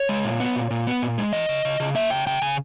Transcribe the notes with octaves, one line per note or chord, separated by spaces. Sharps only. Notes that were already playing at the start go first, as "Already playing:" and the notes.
Already playing: C#5
G#3
A#2
B3
A#2
A#2
B3
A#2
G#3
E3 D#5
C#3
C#3
C#3
A#3 E5
C#3 G5
C#3 G5
C#3 G#5